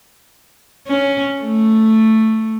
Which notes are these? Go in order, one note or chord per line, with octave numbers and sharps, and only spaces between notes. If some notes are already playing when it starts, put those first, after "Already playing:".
C#4
A3